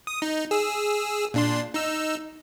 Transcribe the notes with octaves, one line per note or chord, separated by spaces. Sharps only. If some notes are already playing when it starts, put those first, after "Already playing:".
D#6
D#4
G#4 E6
A#2 D4 C6
D#4 E6